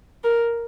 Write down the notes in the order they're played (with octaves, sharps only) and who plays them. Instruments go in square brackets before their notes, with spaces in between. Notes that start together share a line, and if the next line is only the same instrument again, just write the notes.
[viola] A#4